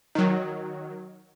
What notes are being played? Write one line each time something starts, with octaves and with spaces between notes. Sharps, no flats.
D#3 F#3